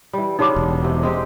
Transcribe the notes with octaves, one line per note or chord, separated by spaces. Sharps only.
E3 G3
C#3 G3 D4 D#4 F#4 D6
E1
C3
G#3 C4 G4